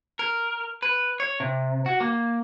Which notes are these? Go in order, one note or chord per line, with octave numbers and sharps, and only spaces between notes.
A#4
B4
C#5
C3
F#4
A#3